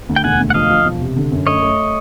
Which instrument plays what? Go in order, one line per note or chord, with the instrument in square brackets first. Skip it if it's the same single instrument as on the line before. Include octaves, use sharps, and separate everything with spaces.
[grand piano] D2
[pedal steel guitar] G5
[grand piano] E1 [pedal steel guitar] F#5 G#5
[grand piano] D2
[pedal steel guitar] F#5
[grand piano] F3 [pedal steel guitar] D#5 F5
[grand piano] F3
E1
C3
D3
F#2
[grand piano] A3 [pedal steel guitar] C#5 D#5
[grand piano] A3